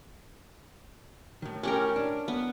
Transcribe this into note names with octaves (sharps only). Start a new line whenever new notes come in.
A2 D#3
A2 C#4 G4 A#4
D4
B3